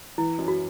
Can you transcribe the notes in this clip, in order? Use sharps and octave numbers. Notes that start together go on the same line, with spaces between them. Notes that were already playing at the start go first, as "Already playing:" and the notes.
E3 E4
F#2
F#4